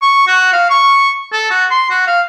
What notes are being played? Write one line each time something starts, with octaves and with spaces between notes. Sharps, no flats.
C#6
F#4
F5
C#6
A4
F#4
C6
F#4
F5